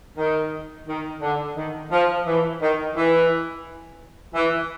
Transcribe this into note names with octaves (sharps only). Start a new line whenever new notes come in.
D#3
D#3
D3
D#3
F3
E3
D#3
E3
E3